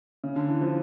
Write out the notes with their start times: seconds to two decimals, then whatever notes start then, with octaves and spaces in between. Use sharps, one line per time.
0.24 C#3
0.36 D3
0.48 E3
0.61 F3